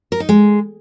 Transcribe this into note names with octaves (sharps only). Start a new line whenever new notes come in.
A#4
D#4
G#3